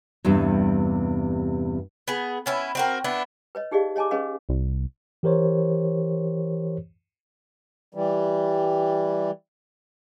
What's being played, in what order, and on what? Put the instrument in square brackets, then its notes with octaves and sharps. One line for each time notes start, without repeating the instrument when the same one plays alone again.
[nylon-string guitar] E2 G2 C3 G3
[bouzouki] B3 G#4
B3 C#4 E4
C4 F#4 A#4
B3 D4 E4
[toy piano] B4 C#5 D#5
D#4 G4 G#4 D5 D#5 F5
C#5 D#5 G#5 A5 D6
C#4 G#4 B4 C#5 D#5 F5
[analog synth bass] C2
[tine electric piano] E3 G4 A#4 C5 C#5
[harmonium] E3 G3